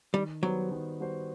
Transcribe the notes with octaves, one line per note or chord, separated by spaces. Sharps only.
D#3 G3
F#3 G3 B3 F#4 C5
D#3
G3 B3 F#4 C5